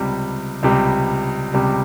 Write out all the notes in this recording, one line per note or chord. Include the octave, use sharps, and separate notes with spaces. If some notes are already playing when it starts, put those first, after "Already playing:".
Already playing: C#2 C3 G3
C#2 C3 G3
C#2 C3 G3